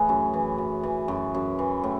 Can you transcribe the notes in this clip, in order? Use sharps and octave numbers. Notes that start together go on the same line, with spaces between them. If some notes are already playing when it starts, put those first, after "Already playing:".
Already playing: A2 E3 G#4
F#2
E3
F#2
E3
F#2
F#2
E3
A2